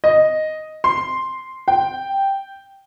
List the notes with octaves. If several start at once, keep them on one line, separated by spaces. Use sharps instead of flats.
D#5
C6
G5